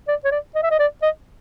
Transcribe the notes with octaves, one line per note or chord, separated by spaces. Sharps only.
D5
C#5
D5
D#5
E5
D#5
D5
D#5